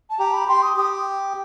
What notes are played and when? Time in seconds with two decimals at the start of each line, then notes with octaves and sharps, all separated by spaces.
0.10 A5
0.19 G4 A#5
0.33 B5
0.48 G4 C6
0.62 D#6
0.77 G4 D#6